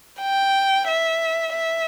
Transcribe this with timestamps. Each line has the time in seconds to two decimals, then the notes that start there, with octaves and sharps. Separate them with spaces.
0.21 G5
0.88 E5
1.55 E5